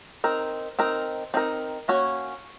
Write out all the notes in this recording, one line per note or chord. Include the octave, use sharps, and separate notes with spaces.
C4 D#4 A#4
C4 D#4 A#4
C4 D#4 A#4
A#3 C#4 F#4 C#5